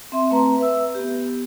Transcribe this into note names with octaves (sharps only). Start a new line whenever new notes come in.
C4 E5 C6
A3 C4 B4 A#5
B4 E5 E6
B3 G4